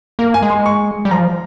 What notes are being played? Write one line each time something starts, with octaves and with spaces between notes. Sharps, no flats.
A#3 A#4
G#5
G#3
C6
C#6
G3
F3 A#5